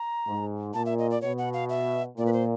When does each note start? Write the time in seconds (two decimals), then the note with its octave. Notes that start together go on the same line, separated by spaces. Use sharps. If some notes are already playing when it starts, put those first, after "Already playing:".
Already playing: A#5
0.27 G#2
0.74 A#2 A5
0.86 E5
0.99 D#5
1.10 D5
1.21 B2 C#5
1.38 F#5
1.53 F5
1.69 E5
2.17 A#2 D5
2.26 B4
2.33 C5